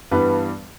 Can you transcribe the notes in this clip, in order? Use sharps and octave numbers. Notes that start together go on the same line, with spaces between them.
G2 E3 G3 B3 D4 B4